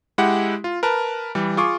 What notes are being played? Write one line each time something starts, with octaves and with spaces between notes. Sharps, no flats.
G#3 E4 G4 F#5
F4
A#4 B4 A5
E3 G3
F4 G#4 C#6 D6